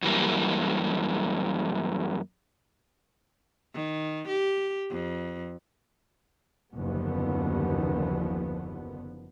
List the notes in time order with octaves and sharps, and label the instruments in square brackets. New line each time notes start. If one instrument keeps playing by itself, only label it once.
[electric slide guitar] F#2 E3 G3 A#3
[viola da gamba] D#3
G4
F2
[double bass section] F#1 D#2 D3 F3 B3